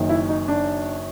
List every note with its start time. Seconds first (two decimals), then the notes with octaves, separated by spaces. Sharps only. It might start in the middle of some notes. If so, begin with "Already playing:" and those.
Already playing: F#1 F#2 D#3
0.09 E4
0.29 D#4
0.48 D4